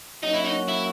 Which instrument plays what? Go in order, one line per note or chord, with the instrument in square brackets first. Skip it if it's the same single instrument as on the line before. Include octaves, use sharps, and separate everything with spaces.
[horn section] F#3 A#3 C#4 F#4 [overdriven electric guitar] D#4
[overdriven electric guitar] E4
D#4
E4